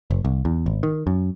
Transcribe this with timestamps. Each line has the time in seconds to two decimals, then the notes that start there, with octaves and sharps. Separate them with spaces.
0.11 F#1
0.25 C2
0.45 E2
0.66 G#1
0.83 D#3
1.07 F#2